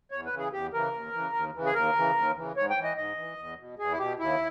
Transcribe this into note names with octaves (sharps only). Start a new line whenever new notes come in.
E2 C#5
B4
C#3 E3
G#4
E2 G4
C#3 E3 A#4
D#2
C#3 E3
D#2
C#3 E3
G#4
D#2 A#4
C#3 E3
D#2
C#3 E3
G#2 C#5
G5
E3
D#5
G#2 D#5
E3
E2
B2
E2 G#4
E4
B2 G4
D#2 E4